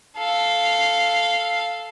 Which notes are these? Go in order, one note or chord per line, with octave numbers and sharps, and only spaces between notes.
A4 F5